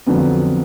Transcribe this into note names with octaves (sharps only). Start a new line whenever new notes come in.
F2 D3 F#3 B3